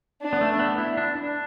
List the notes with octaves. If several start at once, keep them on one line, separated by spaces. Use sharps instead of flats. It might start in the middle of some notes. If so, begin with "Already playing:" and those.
D4
B3
A3
B3
E4
D4
D4